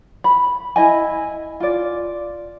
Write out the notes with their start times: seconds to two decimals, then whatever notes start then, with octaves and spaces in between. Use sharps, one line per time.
0.24 B5
0.76 E4 D#5 G#5
1.60 F4 D5